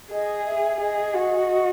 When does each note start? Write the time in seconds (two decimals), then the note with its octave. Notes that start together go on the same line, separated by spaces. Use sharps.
0.11 G#4 D#5
0.46 E5
0.80 G#4 D#5
1.14 F#4